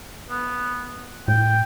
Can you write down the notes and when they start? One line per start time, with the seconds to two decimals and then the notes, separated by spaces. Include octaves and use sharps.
0.30 B3
1.28 A2 G5